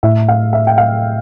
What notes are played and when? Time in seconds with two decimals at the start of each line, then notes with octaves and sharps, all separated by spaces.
0.03 A2 E5
0.28 F5
0.53 E5
0.67 G5
0.78 F5